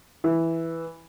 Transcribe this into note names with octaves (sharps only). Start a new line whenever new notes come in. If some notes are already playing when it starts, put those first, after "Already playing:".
E3